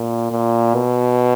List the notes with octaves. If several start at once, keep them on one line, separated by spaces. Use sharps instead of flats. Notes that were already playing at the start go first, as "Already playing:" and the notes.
Already playing: A#2
A#2
B2